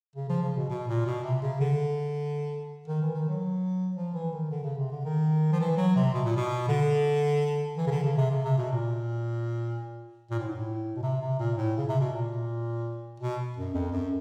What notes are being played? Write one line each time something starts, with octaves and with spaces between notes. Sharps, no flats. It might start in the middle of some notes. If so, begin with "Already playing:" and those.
C#3
F3
C#3
B2
B2
A#2
B2
C3
C#3
D3
D#3
E3
D#3
F#3
F3
E3
D#3
D3
C#3
C3
D3
D#3
F3
E3
F#3
C3
B2
A#2
B2
D3
E3
C#3
D3
C#3
C3
C#3
C3
B2
A#2
A#2
A2
G#2
A2
B2
C3
C3
A#2
A2
C#3
C3
B2
A#2
B2
F#2
F2
F#2